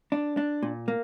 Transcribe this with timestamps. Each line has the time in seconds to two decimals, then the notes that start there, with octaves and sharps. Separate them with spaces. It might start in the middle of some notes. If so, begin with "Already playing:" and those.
0.12 D4
0.37 D4
0.63 A#2
0.88 A#3